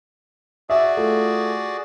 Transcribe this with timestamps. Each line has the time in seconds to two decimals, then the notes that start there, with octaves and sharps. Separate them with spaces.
0.70 F#4 G#4 D5 E5
0.97 A3 F4